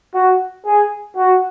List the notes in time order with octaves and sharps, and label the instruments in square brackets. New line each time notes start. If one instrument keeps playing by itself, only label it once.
[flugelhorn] F#4
G#4
F#4